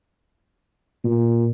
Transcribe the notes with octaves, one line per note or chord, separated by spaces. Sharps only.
A#2